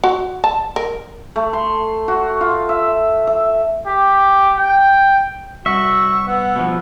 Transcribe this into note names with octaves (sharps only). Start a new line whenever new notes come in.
F#4
A5
A#4
A3
C6
F#4
F4
E5
E5
G4
G5
C2 F#4 E5 C#6
B3 F#5
B2 F3